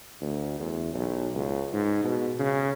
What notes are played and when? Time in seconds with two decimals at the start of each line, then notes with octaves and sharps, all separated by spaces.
0.21 D2
0.60 E2
0.94 B1
1.34 C#2
1.73 G#2
2.04 B2
2.39 C#3